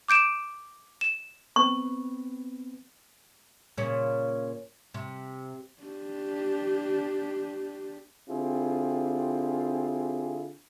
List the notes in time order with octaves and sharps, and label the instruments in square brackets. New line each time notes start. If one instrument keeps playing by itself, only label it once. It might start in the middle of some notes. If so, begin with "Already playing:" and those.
[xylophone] D6 G6 D7 E7
E7
[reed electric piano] B3 C4 B4 [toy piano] C#6
[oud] A#2 C#3 C#4
C3
[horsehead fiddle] D4 G4
[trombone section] D3 C4 E4 F4 G4 G#4